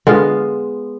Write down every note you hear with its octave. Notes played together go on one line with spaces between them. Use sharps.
D3 G#3 B3 F4